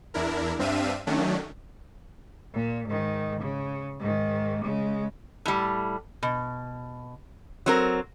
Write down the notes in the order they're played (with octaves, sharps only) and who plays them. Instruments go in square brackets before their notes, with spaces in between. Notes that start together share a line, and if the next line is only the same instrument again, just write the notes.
[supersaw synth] E2 D4 E4 A#4
G2 C4 D4 E5 F5 D#7
D#3 F#3 A3 C#4 D4
[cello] A#2
G#2 D#3
C#3
G#2 D#3
C#3 G#3
[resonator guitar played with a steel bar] A2 G3
B2
F#3 C4 A#4